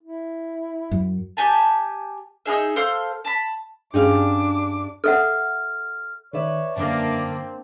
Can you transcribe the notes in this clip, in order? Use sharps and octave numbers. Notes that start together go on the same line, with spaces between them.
E4
F#2
G4 G#5 A5
D#4 F4 G#4 E5
A4 C5 F5
A5 B5
G2 C#4 D4 G4 G#4 F5 D6
A4 E5 F#5 F6
D#3 B4 C#5 D5 E5
F#2 D3 A#3 C4 D4